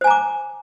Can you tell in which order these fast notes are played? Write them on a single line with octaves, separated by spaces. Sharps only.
C5 G#5 A#5 D6